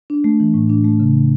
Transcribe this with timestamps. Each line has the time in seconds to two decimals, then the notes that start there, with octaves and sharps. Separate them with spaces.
0.10 D4
0.24 A3
0.40 E3
0.54 A2
0.70 D4
0.85 A3
1.00 C#3